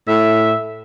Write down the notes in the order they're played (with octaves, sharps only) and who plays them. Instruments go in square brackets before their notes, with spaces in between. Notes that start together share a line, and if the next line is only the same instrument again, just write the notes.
[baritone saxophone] A2 [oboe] E5